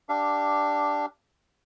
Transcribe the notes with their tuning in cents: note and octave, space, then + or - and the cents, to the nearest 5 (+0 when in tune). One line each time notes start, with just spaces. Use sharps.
D4 +0 G4 +0 F5 -30